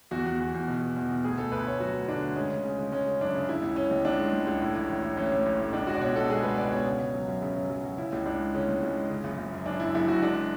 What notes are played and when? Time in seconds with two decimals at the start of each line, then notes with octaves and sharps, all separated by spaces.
0.11 E2 F#4
0.26 E2
0.40 E2
0.54 E2
0.68 B2
0.81 E2
0.96 E2
1.09 B2
1.24 D2 G#4
1.38 D2 A4
1.52 D2 B4
1.66 D2 C#5
1.80 F#3 F#4
1.94 D2
2.08 D3 D4
2.22 D2
2.36 G#3 C#4
2.50 C#3
2.65 C#3
2.79 G#3
2.92 G#3 C#4
3.07 C#3
3.21 F#2 D4
3.35 C#3
3.48 C#3 E4
3.62 C#2
3.76 C#3 C#4
3.91 C#2
4.05 C#2 D4
4.19 G#3
4.33 C#2
4.47 C#2
4.62 A2
4.75 A1
4.89 A1
5.03 A2
5.17 A1 C#4
5.32 A2
5.46 A1
5.59 A2
5.73 C#2 D4
5.87 G#3 F#4
5.95 D5
6.01 B2 C#5
6.15 B2 A4
6.30 G#3 G#4
6.43 C#2 B4
6.58 C#2 D5
6.72 B2 C#5
6.86 C#3
7.00 C#3
7.13 F#3
7.28 F#2
7.42 C#3
7.56 F#3
7.69 F#3
7.84 F#3
7.97 C#3 E4
8.12 C#2
8.26 C#2 D4
8.40 G#3
8.55 C#3 C#4
8.69 C#2
8.83 C#2
8.96 G#3
9.10 C#3
9.24 F#1
9.38 F#1
9.52 F#2
9.66 F#2 D4
9.80 F#1 E4
9.95 F#1 E4
10.08 F#1 F#4
10.22 G#3 D4